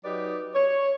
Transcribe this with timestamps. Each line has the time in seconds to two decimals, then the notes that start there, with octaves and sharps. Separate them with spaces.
0.04 F#3 D#4 G4 B4 D5
0.54 C#5